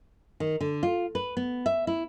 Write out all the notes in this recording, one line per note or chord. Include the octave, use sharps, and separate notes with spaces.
D#3
D3
F4
B4
B3
E5
E4